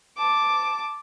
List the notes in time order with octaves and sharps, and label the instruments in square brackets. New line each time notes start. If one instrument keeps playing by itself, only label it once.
[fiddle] A5 D6